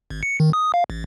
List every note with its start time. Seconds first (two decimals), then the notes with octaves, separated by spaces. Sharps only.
0.10 G#1
0.23 C#7
0.40 D#3
0.53 D#6
0.74 F5
0.90 A1